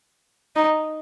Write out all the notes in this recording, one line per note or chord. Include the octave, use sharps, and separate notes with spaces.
D#4